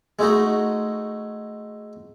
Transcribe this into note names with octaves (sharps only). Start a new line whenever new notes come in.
G#3 A3 D#4 F#4